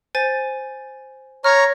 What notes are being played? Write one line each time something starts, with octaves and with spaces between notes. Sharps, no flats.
C5 G#5 A6
C#5 A#5 F6 G#6